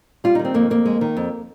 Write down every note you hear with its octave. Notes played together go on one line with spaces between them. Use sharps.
G3 F4
D#4
D#3
C4
F2 A#3
F2 A#3
G#3
D#3
F2